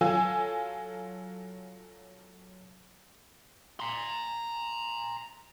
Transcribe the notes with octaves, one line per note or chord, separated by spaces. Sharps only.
F#3 F4 A4 G#5 E6
A#5 C6